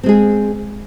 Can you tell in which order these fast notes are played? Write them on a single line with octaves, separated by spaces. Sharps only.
C4 G#3 G#4